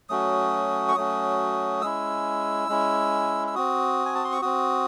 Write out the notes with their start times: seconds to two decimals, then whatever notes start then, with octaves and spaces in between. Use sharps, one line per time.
0.09 F#3 A3 C#4 F#4 D#6
0.88 C#6
0.95 F#3 A3 C#4 F#4 D#6
1.82 G#3 C#4 E4 E6
2.69 G#3 C#4 E4
3.47 E6
3.55 C4 F#4 D#6
4.05 G#5
4.15 A5
4.24 C6
4.32 C#6
4.42 C4 F#4 D#6